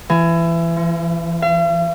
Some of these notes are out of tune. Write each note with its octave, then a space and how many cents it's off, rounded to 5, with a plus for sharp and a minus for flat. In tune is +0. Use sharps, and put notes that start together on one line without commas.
E3 +25
F3 -30
F5 -45